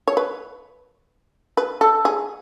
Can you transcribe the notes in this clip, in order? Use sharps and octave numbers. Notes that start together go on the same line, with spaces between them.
C#5
B4
B4
A4
G#4